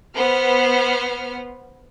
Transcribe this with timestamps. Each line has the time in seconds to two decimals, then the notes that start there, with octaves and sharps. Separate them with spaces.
0.14 B3 C5 F6